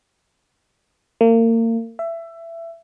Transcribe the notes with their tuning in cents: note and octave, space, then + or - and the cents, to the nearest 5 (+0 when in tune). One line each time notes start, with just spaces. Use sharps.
A#3 -35
E5 +20